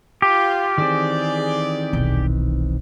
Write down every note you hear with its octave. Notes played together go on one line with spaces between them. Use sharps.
F4 G4
D#3 E3 C4 G#4 D5
D#1 B1